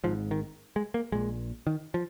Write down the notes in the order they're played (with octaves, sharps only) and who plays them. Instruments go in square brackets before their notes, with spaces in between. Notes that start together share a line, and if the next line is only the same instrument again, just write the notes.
[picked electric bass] G#2 F3
G#1
D#3
G#3
A#3
A#1 A#2 G#3
D#3
F3